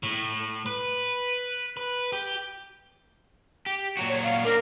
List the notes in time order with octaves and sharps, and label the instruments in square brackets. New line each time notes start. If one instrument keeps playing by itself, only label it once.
[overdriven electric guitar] A2
B4
B4
G4
[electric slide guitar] G4
A#2 F#3 F#4
[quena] C#5
F5
[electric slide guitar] A#3 D4 [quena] A#4